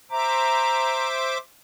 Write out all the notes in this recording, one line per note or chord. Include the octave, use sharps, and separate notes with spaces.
C5 E5 A#5 D6